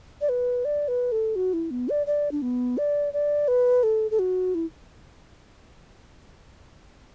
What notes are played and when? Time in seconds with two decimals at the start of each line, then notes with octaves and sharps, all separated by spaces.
0.21 D5
0.29 B4
0.65 D5
0.88 B4
1.12 A4
1.36 F#4
1.53 E4
1.71 B3
1.89 D5
2.07 D5
2.32 D4
2.42 B3
2.78 D5
3.13 D5
3.48 B4
3.83 A4
4.11 A4
4.19 F#4
4.55 E4